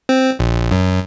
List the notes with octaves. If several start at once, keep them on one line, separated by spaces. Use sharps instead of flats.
C4
A#1
F#2